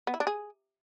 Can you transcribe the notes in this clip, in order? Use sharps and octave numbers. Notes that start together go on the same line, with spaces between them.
B3
E4
D4
G#4